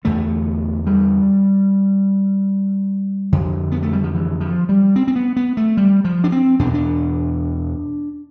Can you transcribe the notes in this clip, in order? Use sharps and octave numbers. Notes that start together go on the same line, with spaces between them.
E2 D3 A3
G3
F2 D3
B3
A3
G3
F3
E3
F3
G3
C4
C4
B3
B3
A3
G3
F3
D4
C4
E2 B2 D4
D4